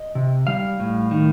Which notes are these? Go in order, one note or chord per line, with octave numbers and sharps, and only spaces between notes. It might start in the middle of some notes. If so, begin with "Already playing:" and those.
Already playing: D#5
C3
G3 F5
A2
D#3